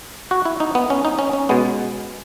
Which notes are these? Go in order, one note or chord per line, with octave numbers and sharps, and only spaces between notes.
F#4
E4
D#4
B3
C#4
D#4
C#4
C#4
B2 G#3 B3